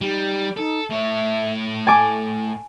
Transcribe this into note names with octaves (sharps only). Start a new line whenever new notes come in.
G3 D#4
D#4 A4
A2 C#5 E5
A3 G#5 A5 D6